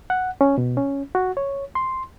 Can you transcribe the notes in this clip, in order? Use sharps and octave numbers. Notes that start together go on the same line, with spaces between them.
F#5
C#4
B2
C#4
F#4
C#5
C6